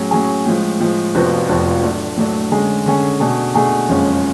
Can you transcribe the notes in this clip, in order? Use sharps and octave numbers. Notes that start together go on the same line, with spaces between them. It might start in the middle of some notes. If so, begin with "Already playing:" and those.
Already playing: A2 F#3 C#4 G#4
A2 F#3 C#4 G#4
A2 F3 G#3
A2 F3 G#3
F1 F2 F3 B3 F#4
F1 F2 F3 B3 F#4
A2 F#3 A3 D4
A2 F#3 A3 D4
D3 G#3 C#4 G#4
D3 G#3 C#4 G#4
B2 A3 D4 G#4
B2 A3 D4 G#4
F#1 F2 C#3 G#3 C#4